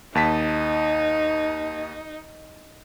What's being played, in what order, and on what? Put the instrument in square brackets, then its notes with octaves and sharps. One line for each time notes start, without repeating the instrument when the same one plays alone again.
[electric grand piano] D#2 A5 B6 [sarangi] D#4